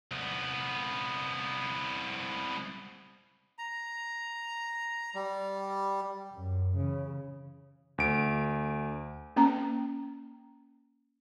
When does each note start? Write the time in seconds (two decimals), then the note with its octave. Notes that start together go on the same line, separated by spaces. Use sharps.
0.11 C2 B3
3.59 A#5
5.15 G3
6.32 F#2
6.76 C#3 E3
7.98 D2 D7
9.36 A#3 C#4 A#5